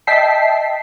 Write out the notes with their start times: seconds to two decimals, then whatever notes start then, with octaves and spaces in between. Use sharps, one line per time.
0.07 D#5 E5 G5 A5 B6 C7